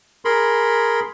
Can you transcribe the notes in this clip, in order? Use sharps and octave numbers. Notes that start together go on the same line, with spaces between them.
G#4 A#4 B5 C6